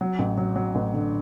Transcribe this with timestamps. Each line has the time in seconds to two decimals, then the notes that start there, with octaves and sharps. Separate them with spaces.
0.01 F#3
0.19 A1
0.38 F#3
0.56 F#3
0.75 A1
0.94 D3